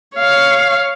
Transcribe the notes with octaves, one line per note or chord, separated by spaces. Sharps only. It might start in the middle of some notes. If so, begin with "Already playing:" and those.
C#5 F5